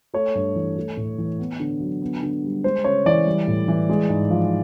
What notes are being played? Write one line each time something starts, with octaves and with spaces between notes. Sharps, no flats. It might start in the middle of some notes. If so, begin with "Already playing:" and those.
A3 C#5
G2
E3
A3
A2
E3
B3
D3
F#3
B3
D3
G3
G#3 C5
C#3 C#5
E3 D5
G3
A2
E3
G#3
G#2
F3